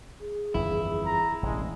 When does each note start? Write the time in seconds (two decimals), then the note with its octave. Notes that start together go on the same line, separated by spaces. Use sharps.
0.20 G#4
0.54 G1 F2 E3 E4
1.05 A#5
1.43 E1 A1 G#3